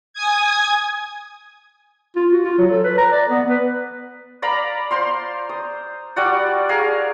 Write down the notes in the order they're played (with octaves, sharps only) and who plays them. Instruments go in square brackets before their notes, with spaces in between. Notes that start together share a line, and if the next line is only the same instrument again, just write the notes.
[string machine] G#5 D#6 G#6
[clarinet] F4
F#4
F4
F#3
A4
B4
A#5
D5
B3
B4
[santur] D5 F5 A#5 B5
C5 F5 C6
D#6
G3 F#4 D5 F#5
G#4 A#4 F5